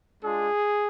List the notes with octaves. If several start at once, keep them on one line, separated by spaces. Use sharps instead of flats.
G#3 D4 F4 G#4